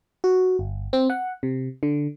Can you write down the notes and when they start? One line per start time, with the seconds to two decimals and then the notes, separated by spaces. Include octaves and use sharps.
0.24 F#4
0.59 G1
0.93 C4
1.10 F#5
1.43 C3
1.83 D3